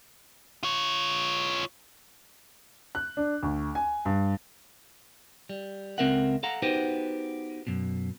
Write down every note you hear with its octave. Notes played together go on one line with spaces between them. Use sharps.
F4 C#5
F#6
D4
D2
G#5
G2
G3
C#2 C4 A4 A#4 E5 F#5
A4 F5 F#5 A#5
B3 D#4 F#4 G4 B4 C5
F#2 B2